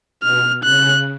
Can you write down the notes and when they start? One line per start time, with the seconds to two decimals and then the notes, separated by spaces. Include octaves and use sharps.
0.23 B2 F6
0.64 C#3 F#6